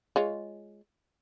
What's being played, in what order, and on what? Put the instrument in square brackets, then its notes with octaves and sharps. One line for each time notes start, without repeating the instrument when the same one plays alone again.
[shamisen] G#3 F4 C#5